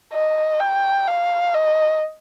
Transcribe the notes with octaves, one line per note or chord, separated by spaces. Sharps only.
D#5
G5
F5
D#5